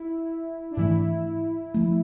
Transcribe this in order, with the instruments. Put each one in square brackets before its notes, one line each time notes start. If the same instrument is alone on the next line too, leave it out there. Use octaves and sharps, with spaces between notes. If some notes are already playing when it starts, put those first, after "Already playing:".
Already playing: [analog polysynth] E4
D4
[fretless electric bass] G#2 E3 A3 [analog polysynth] E4
[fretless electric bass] F3 A3